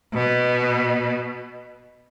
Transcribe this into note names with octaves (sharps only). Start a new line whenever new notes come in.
B2